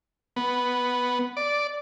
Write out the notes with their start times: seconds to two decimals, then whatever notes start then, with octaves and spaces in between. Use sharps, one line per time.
0.36 B3
1.37 D5